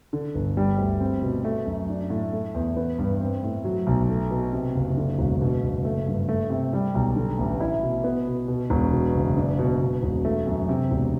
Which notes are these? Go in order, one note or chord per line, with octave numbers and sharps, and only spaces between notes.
D3
G1
G3
D2
C4
B2
A3
F#2
D4
A2
A3
E2
B3
G2
C4
A2
F#3
B1
A3
B2
C3
F#1
D3
E1
B2
F#1
A3
G2
A3
C3
G3
B1
D3
A1
E4
B2
B3
B2
B2
E1
B2
F#1
D4
B2
B2
E1
A3
F#2
C3
E1